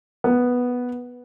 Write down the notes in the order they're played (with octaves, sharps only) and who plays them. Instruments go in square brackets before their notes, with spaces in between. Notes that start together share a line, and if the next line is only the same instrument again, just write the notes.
[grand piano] B3